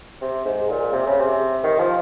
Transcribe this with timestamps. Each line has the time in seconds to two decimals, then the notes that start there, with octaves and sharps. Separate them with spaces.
0.22 C3
0.45 G#2
0.70 A#2
0.93 C3
1.06 C#3
1.20 C3
1.64 D#3
1.79 F3